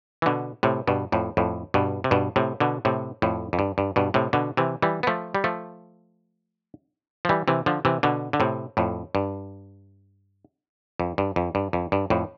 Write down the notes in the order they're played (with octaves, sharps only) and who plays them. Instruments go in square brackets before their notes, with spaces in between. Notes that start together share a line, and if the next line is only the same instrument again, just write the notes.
[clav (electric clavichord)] E3
B2 D3
A2 C3
G2 B2
F2 A2
F2 A2
G2 B2
C3
G2 B2
A2 C3
B2 D3
A2 C3
F2 A2
F2
G2
G2
G2 B2
A2 C3
B2 D3
C3 E3
E3 G3
B3
F3 A3
G3
F3 A3
F3
E3 G3
C3 E3
D3 F3
C3 E3
B2 D3
D3
A2 C3
F2 A2
G2
F2
G2
F2
G2
F2
G2
F2 A2